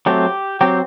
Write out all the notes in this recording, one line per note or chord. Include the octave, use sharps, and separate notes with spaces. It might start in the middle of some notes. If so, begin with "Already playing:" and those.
F#3 A3 C4 G4
F#3 C4 G4